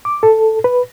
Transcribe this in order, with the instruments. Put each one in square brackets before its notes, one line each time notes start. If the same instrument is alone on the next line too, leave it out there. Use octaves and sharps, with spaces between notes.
[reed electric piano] D6
A4
B4